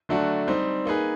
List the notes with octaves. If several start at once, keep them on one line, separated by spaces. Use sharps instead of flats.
D3 F#3 A3 D4 F#4
G3 C4 D#4
A#3 D#4 G#4 B4